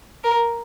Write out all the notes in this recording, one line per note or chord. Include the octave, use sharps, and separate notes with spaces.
A#4